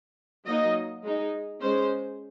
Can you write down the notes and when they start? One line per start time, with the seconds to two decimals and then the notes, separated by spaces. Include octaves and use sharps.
0.45 F#3 A#3 D#4 D#5
1.02 G#3 D#4
1.60 G#3 C#4 C5